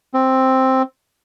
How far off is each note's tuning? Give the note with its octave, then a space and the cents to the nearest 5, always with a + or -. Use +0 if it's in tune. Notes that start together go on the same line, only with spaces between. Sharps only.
C4 +5